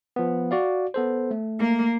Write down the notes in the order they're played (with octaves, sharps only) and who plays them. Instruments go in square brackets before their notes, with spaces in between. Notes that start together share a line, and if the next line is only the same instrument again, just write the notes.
[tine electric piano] F3 B3
F#4 D5 F5
B3 A4 C5
A3
[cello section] A#3